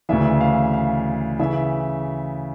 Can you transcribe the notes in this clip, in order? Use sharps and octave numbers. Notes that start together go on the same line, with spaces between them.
D2 C#3 E3 E5
F5
F5
C#3 E3 E5